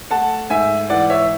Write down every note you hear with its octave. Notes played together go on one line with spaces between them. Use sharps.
A3 F#5 A5
G#2 E5 G#5
E3 D5 F#5
C#5 E5